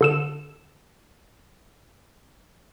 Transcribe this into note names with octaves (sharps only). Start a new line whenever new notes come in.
D3 A4 E7